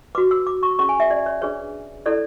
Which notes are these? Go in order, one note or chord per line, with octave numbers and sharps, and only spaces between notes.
F#4 B4 D6
E6
D6
C#6
C#4 G#4 C#5 C#6
G#5
E5
D5
C#5
D4 G#4 B4 C#5
E4 A4 C#5 D5